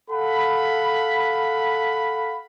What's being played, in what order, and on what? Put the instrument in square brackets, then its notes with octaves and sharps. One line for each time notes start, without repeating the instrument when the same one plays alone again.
[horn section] A4 F5 F#5 B5